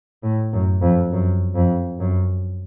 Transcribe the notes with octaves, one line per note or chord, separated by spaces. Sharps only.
A2
F#2
F2
F#2
F2
F#2